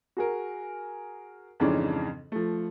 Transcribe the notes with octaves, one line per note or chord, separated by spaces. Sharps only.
F#4 G#4 A#4
F2 G#2 C#3 E3 C#4 D4
F3 A3